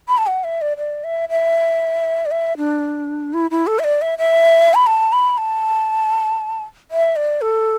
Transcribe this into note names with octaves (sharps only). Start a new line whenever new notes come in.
B5
A5
F#5
E5
D5
D5
E5
E5
D5
E5
D4
E4
E4
A4
E5
D5
E5
E5
B5
A5
B5
A5
E5
D5
A4